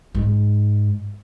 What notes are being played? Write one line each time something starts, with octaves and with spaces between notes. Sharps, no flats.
G#2